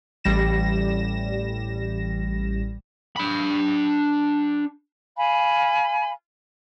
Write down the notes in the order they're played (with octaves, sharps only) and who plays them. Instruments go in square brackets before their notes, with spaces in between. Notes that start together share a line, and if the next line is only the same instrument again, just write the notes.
[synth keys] A1 G3 A#6 E7
[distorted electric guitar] D4 B5
[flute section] F5 G#5 B5